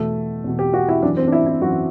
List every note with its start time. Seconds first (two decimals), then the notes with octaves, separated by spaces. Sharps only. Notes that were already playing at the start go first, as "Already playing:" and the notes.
Already playing: E2 B2 A3
0.44 E2 B2
0.59 G4
0.74 F#4
0.89 E4
1.02 F#2 E3 D4
1.17 C4
1.27 D4
1.32 E4
1.46 E4
1.62 F#2 F#4
1.66 E3